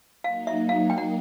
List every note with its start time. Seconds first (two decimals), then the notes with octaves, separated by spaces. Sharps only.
0.24 F#3 A#3 D#4 F5
0.47 E5
0.69 F5
0.90 G5
0.98 F#5